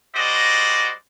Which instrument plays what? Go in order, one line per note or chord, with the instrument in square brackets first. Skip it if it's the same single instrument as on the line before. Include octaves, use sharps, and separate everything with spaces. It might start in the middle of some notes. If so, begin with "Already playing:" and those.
[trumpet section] G3 G#3 F#4 C5 D5 D#5